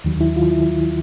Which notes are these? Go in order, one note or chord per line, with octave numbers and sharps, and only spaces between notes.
D#2 D#3 F#3
E4
F4
E4